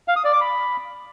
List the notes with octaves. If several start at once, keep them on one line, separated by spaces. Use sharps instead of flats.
F5
D#6
D5
D6
B5